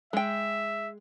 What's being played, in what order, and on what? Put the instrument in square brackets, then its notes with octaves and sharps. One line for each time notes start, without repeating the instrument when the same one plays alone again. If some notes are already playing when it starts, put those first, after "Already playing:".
[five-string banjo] G#3 G5 [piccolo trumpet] E5